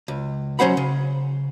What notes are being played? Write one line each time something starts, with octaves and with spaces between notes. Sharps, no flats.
C#2
F#3 C#4 C5 F#5 B5
C#3